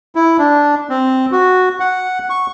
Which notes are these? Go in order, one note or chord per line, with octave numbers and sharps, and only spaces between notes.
E4
D4
C4
F#4
F#5
C#6